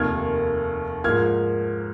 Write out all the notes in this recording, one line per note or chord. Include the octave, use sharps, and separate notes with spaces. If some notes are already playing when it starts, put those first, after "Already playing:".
Already playing: F1 D#2 D#3 A#3 F6 G#6
G#2 F3 A#3 F6 G#6